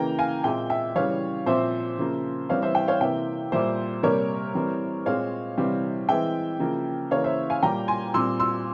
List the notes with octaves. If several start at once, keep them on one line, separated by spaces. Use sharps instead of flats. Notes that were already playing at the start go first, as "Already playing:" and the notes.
Already playing: C#3 E3 A#3 G5 A#5
F5 G#5
A#2 G#3 C4 E5 G5
E5 G5
C#3 E3 G3 C#5 F5
A#2 F3 C4 C5 E5
C#3 F3 A#3
E3 G3 C4 C#5 F5
C5 E5
E5 G5
C#5 F5
C3 E3 A#3 E5 G5
A#2 G3 A#3 C5 E5
C3 G3 A#3 A#4 C#5
E3 G3 C4
A#2 G#3 C4 C#5 F5
C3 E3 G3 C4
E3 G#3 C4 E5 G5
C#3 F3 A#3
C#3 E3 A#3 C#5 F5
C5 E5
F5 G#5
A#2 G3 A#3 G5 A#5
G#5 C6
A#2 G3 C4 C6 E6
C6 E6